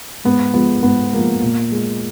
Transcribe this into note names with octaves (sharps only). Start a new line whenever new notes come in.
G#2 B3
F3 G#3 B3
G#2 B3
F3 G#3 A#3
A#2
G#3